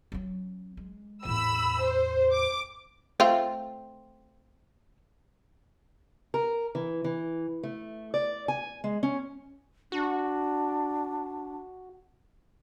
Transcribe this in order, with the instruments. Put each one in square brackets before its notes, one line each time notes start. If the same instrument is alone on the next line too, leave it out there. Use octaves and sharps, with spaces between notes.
[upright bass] F#3 C#4
G#3
[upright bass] E2 A2 [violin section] B5 E6
[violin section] C5
D6
[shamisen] A3 C4 F4
[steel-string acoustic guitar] A#4
E3
E3
A3
D5
G#5
G#3
C#4
[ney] D4 [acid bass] F#4